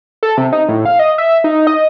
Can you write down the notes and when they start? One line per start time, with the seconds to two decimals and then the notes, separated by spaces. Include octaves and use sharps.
0.23 A4
0.37 C3
0.52 D#4
0.69 A2
0.85 F5
0.99 D#5
1.18 E5
1.44 D#4
1.67 D#5